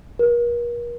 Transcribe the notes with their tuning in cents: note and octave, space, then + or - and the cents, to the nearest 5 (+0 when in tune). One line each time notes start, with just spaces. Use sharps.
A#4 +40